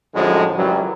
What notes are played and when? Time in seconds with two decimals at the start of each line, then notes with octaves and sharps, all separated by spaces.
0.15 F#2 A2 D3 F3 F#3 G#3
0.57 C#2 F#2 E3 F#3 G3